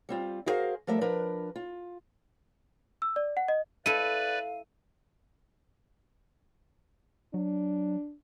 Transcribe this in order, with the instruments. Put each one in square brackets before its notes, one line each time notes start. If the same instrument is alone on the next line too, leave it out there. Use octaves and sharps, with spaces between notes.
[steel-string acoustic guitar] G3 C4 F4
E4 F#4 G#4 A#4 C5 F5
F3 G3 A3 A#4 D5 E5
F3 D4 A#4 B4
F4
[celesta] E6
D5
F#5
D#5
[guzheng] E4 A4 [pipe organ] B4 D5 [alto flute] F5 [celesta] D#7
[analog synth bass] F#3 [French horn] D4